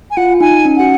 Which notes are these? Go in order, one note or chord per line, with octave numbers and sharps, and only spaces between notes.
G#5
F4 F#5
D#4 G#5
C#4
F#4 F#5